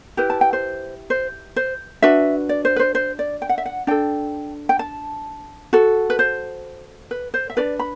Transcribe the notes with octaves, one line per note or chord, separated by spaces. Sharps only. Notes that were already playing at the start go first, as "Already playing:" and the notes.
E4 G4 B4
A5
G5
C5
C5
C5
D4 F#4 B4 E5
D5
C5
B4
C5
C5
D5
G5
F#5
E5
F#5
D4 A4 G5
G5
A5
F#4 A4
B4
C5
B4
C5
E5
D4 F#4 B4 D5
B5